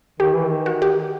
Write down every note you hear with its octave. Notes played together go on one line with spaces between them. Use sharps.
D#3 G4
E3
D#3
F#4
G4